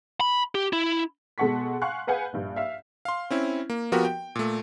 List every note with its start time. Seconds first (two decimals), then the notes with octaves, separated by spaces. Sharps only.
0.21 B5
0.55 G4
0.73 E4
1.38 B2 G#3 A4 F#5 C#6 B6
1.82 F5 F#5 G#5 C6 C#6 F#6
2.07 G#4 B4 F5 F#5 G#5 G6
2.33 A#1 G2
2.56 E5 F5
3.05 F5 C6
3.30 C4 C#4 E4
3.70 A#3
3.92 F3 B3 F#4 G4 A#4
4.05 G5
4.35 A#2 A3